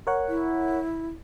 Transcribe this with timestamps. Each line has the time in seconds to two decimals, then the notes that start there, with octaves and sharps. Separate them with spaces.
0.07 A#4 C#5 F#5
0.29 E4